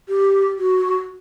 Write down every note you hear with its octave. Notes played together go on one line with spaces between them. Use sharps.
G4
F#4